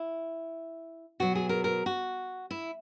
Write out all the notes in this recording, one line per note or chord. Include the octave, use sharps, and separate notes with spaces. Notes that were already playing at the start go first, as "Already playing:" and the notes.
Already playing: E4
B2 F#3 F#4
G#4
A#4
A#4
F#4
E4